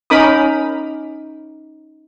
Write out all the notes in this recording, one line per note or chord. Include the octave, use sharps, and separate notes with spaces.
C#4 D#4 A#4 B5 D6 D#6